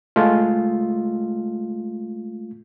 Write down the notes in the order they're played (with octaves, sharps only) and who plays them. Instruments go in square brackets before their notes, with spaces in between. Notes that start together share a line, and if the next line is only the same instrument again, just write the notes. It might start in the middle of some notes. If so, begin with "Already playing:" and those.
[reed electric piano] G#3 A3 F4